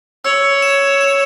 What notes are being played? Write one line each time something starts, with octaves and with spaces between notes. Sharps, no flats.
C#5 E6
E7
E7